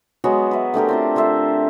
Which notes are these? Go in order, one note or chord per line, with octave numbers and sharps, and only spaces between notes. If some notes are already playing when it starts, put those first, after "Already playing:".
F#3 G#3 B3 F#4
B4 E5
A3 D4 G4 A#4
C4 F4 C5
D3 F4 C5 E5